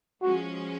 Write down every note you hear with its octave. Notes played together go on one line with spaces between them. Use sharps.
F3 G#3 C#4 F#4